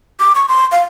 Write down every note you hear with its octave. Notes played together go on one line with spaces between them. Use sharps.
D6
C#6
C6
F5